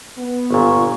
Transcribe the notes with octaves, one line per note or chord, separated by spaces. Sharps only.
B3
G1 A#2 C#6